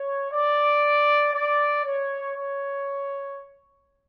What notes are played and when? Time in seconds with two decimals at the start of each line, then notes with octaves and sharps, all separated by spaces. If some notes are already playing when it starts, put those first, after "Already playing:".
Already playing: C#5
0.31 D5
1.34 D5
1.84 C#5
2.36 C#5